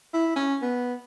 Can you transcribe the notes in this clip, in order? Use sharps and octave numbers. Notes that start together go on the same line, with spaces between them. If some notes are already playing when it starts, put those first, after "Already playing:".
E4
C#4
B3